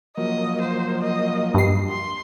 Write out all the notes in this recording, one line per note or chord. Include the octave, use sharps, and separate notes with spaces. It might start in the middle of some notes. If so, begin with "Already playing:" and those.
F3 F#3 A#3 D#5
C5
D#5
G2 C7
C6